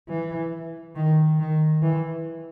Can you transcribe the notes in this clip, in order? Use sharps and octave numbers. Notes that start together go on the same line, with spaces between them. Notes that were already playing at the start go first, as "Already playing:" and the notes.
E3
D#3
D#3
E3